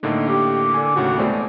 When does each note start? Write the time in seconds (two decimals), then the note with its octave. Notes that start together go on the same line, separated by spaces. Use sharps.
0.03 A2 D3 A#3 D#4
0.28 G4 D6
0.74 D3 G#5
0.96 D#2 A2 C#3 F#4
1.18 B2 G#3 A3 C4 D5